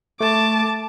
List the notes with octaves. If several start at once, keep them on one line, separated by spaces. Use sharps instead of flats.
A3 A5 D6